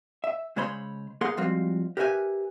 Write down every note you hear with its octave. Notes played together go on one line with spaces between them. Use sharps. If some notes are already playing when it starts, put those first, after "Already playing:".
E5
C#3 G#3 C5 C#5 B5 C6
A#3 G#4 A#4 F5 F#5 C6
F3 G3 G#3 C4 F4 F#4
G4 A#4 B4 E5 F#5 G#5